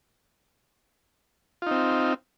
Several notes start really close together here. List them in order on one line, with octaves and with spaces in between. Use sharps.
F4 D#4 C4